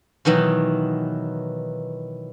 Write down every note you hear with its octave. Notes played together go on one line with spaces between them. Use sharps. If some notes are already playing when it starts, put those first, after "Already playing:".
B2 D#3 E3 F#3